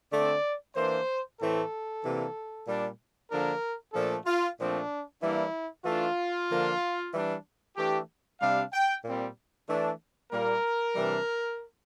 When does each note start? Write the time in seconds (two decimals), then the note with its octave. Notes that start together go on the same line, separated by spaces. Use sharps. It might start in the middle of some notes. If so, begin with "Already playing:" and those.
0.11 D3 A3 C4 D5
0.75 E3 A#3 D4 C5
1.39 A2 E3 A3 C4 A4
2.03 C3 E3 A#3 D4
2.67 A#2 G3 D4
3.30 D3 F3 A#3 D4 A#4
3.93 A#2 F3 A3 D4 A4
4.26 F4
4.58 A#2 F3 A3 C4 D4
5.21 E3 G3 A#3 D4 E4
5.85 E3 A3 D4 F4
6.49 D3 F3 A#3 D4
7.12 E3 G3 D4
7.76 E3 A3 D4 G4
8.40 C3 G3 D4 F5
8.72 G5
9.04 A#2 G3 C4
9.68 E3 A3 D4
10.31 A#2 G3 A#3 A#4
10.95 C3 E3 G3 D4